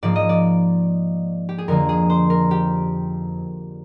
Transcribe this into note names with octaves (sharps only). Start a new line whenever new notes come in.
G#2 F3 A#3 D5
D#5
D5
G4
G#4
F2 D3 F3 A#3 A#4
G#4
C5
A#4
G4